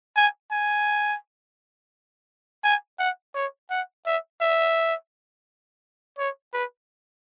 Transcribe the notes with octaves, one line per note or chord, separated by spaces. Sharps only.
G#5
G#5
G#5
F#5
C#5
F#5
E5
E5
C#5
B4